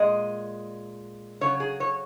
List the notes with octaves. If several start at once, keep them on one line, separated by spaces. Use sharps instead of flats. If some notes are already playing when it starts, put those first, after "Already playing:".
Already playing: A#2 G#3 D#5
C#3 F#3 C#5
G#4
C#5